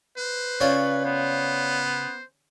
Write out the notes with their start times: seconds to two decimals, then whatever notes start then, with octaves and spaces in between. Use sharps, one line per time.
0.17 B4 C5
0.60 C#3 F4 C#5 D5
1.05 B3 C5